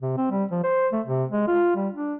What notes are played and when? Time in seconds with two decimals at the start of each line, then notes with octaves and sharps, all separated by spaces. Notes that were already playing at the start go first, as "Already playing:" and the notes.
0.02 C3
0.17 C4
0.31 G3
0.51 F3
0.64 C5
0.93 A3
1.06 C3
1.31 G#3
1.48 F4
1.76 G3
1.94 D4